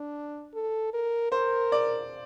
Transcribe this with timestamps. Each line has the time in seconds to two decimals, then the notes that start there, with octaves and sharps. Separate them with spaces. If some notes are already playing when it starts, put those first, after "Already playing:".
Already playing: D4
0.54 A4
0.93 A#4
1.32 A#4 C5
1.72 D5